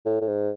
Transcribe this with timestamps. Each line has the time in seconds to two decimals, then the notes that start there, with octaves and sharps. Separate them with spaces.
0.06 A2
0.21 A2
0.28 G#2